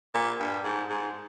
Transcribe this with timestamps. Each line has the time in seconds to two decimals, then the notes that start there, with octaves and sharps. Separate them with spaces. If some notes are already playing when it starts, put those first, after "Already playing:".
0.14 A#2
0.40 G2
0.64 G#2
0.89 G#2